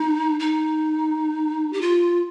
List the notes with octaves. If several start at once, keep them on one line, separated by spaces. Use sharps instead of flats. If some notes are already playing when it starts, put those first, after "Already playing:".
Already playing: D#4
D#4
G4
F4